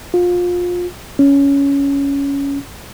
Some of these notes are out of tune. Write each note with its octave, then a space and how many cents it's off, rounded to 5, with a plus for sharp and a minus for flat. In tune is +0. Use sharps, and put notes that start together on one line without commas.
F4 +25
C#4 +10